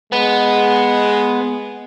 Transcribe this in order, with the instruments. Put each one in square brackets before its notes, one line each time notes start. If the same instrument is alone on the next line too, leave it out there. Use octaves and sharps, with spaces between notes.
[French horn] G#3 [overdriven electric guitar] B3